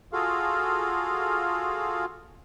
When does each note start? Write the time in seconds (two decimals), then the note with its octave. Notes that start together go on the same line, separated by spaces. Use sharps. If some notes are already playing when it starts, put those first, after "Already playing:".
0.13 F4 F#4 G#4 A4 F5